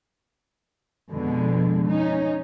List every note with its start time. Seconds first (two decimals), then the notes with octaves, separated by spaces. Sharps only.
1.11 F2 B2 D3 G#3
1.87 C#4 D#4